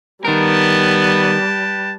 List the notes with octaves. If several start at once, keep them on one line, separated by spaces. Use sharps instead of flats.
D#3 G3 B3 A#4 B4 G5 A5